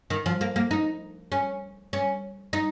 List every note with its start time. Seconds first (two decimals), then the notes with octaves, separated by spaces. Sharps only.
0.10 D#3
0.26 F3
0.41 A#3
0.56 A#3
0.71 D#4
1.32 C#4
1.93 C#4
2.53 D#4